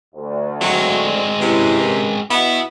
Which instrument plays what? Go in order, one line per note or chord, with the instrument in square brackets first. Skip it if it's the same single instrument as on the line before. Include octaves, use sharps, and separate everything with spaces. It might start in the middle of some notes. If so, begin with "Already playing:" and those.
[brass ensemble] D2
[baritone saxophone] F#3 [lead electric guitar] G#3 C4
[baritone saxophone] C3 [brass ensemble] C#4 E4 B4
[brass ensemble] C#4 A#4 B4
[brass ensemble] B2 [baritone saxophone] B3 [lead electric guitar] E4